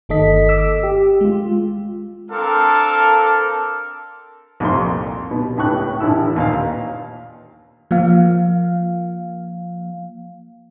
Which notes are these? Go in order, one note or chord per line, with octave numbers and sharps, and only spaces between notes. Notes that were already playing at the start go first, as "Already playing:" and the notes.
G1 D#3 A#3 A4 D#5 B6
D6 E6
G4
G#3 F4
C4 D4 A4 A#4 F5
C2 F2 A#2 C4 C6
B2
C#2 A2 G5 C#6 F#6
A1 D3 E4 E6
D#2 A#2 B4 F5
F3 A#3 F5